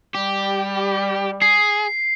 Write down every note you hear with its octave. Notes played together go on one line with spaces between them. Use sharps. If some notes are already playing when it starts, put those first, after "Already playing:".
G3 G4
G#4 C7